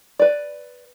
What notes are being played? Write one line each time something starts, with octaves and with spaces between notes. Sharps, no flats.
B4 D5